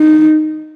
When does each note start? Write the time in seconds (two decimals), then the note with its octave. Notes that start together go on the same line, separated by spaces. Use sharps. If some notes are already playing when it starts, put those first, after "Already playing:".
Already playing: D#4